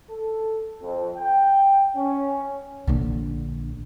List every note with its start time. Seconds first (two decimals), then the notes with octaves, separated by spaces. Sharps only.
0.10 A4
0.82 F2
1.17 G5
1.96 C#4
2.87 A#1 D3